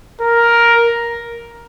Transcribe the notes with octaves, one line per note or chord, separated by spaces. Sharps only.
A#4